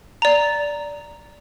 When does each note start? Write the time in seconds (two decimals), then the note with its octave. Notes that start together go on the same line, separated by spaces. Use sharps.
0.22 D5 A#5